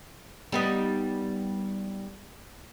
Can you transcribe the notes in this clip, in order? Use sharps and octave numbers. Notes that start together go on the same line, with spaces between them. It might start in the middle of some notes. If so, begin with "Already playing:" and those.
G3 B3 D#4